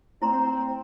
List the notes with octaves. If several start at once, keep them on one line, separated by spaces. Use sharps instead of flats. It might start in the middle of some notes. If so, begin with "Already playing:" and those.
C4 E4 C5 A#5 C6